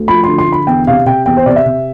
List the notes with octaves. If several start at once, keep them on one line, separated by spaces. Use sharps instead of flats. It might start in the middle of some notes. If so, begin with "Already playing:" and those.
Already playing: D2
F3 B5
D3 C6
C6
D3
B5
E2 G5
C3 F5
C3 G5
E2 G5
C5
C3 D5
E5
C3